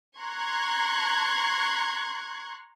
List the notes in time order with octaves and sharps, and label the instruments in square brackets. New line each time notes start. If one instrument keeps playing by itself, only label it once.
[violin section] A#5 C6 C#6 F#6 G#6